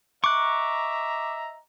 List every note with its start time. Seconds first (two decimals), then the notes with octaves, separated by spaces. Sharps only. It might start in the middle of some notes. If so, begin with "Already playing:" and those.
0.24 D#5 E5 A#5 C#6 D6 F#6